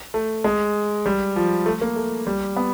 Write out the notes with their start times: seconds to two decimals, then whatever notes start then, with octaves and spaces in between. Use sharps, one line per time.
0.14 A3
0.44 G#3
1.06 G3
1.36 F3
1.66 A3
1.81 A#3
1.96 A3
2.27 G3
2.56 B3